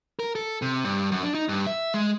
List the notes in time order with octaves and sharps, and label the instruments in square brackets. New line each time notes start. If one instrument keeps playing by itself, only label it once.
[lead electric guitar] A#4
A4
C3
G2
F#2
D4
D#4
G2
E5
G#3